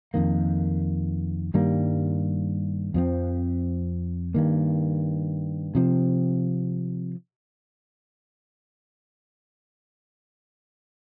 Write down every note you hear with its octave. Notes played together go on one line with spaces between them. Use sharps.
F2 D#3 A#3
G2 D#3 G3 A#3
F2 F3 C4
G2 D#3 A#3
C3 F3 C4